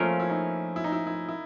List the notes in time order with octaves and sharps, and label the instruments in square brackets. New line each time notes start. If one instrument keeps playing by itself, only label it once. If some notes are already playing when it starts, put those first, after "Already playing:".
Already playing: [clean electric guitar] F3 A3 C#4 F4 A#4 [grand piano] A#3
[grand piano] E4
D#4
E4
D#4
E4
E4
E4